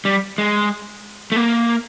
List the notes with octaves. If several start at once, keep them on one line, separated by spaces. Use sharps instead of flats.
G3
G#3
A3
A#3